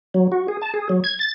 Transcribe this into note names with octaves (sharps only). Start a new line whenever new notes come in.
F#3
F#4
G#4
A5
G#4
F#3
G#6
A6